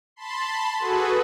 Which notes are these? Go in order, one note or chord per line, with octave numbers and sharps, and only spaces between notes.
A5 B5 C6
F#4 G#4 A4 B4